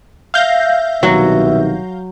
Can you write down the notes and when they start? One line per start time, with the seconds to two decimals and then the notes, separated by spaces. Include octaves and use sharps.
0.34 E5 F5 G6 A#6
1.03 C2 B2 D#3 F#3 F#4